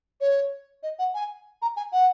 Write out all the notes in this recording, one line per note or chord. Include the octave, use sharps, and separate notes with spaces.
C#5
D#5
F#5
G#5
A#5
G#5
F#5